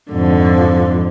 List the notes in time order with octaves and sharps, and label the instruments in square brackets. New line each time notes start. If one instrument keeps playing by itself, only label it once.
[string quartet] F2 G#2 D3 [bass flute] F3